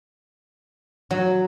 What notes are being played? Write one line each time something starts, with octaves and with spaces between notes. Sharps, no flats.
F#3